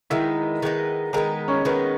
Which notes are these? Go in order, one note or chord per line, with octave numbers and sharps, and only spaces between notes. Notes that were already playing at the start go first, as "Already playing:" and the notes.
D#3 G#3 B3 D#4 E4 E5
D#3 G#3 B3 D#4
D#3 G#3 B3 D#4 A#4
C#4 C#5
D#3 G#3 B3 D#4 B4